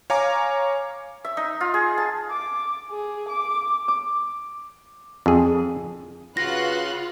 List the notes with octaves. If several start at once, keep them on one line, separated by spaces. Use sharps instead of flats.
C#5 F5 G#5 A#5 D6
E5
D#4
F4
G#4
A5
D6
G#4
D6
D6
F2 G#4
C#3 F4 F#4 B4 F5 C6 F#6 A#6